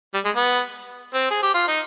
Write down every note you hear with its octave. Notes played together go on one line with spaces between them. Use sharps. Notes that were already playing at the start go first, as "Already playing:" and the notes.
G3
G#3
B3
C4
G#4
G4
F4
D#4